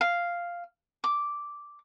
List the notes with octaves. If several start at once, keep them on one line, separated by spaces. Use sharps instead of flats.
F5
D6